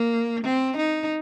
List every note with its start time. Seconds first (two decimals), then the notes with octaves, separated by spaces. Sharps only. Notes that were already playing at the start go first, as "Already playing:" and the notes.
Already playing: A#3
0.44 C4
0.77 D#4